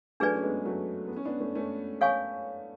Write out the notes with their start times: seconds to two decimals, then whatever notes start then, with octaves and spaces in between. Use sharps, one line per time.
0.20 F#3 A3 D4 G#4 B4 D5 G#5
0.34 C#4
0.43 G#3 B3
0.65 F#3 A3
1.07 B3
1.16 C#4
1.25 B3 D4
1.40 A3 C#4
1.55 A3 C#4
2.01 A4 C#5 F5 G#5 C#6